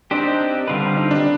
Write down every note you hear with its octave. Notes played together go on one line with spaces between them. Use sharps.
C4 D4 D#4 G4 C5
D3 G3 C4 F4 B4
D#4
D4